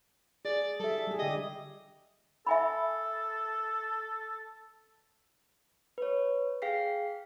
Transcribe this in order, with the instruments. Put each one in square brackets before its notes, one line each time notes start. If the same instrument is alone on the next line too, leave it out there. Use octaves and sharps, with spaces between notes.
[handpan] G#4 [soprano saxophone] D5
[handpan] G3 E5 [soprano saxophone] A4
[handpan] G3 G#4
[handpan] D3 G4 [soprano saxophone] D#5
[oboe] A4 [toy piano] E5 G#5 B5
[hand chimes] B4 C#5
G#4 F5 G5 B6 C7